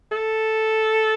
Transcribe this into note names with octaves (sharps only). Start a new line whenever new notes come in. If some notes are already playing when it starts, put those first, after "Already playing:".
A4